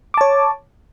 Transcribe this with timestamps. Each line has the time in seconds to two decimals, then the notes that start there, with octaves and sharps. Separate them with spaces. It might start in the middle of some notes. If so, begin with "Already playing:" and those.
0.14 D6
0.18 A5
0.21 C#5